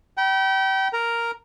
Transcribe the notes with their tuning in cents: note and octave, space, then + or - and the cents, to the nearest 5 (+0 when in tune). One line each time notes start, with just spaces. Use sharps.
G5 -30 B5 -35
A#4 +0 A#5 +0